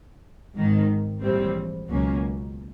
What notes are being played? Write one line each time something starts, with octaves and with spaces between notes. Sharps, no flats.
G#1 G#2 D#3
A#1 A2 E3 G3 C4
C#2 B2 F#3 A#3 C#4